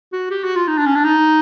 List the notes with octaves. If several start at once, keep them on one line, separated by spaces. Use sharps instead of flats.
F#4
G4
F#4
F4
D#4
D4
C#4
D4
D#4